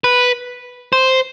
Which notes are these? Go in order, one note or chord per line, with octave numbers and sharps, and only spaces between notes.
B4
C5